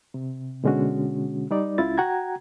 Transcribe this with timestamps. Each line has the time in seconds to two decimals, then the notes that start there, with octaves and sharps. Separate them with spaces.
0.14 C3
0.64 B2 D3 G#3 C#4 F#4
1.51 G3 D#4 D5
1.78 C#2 C#3 E4 F4 A6
1.98 F#4 F#5 G5 A#5 G#6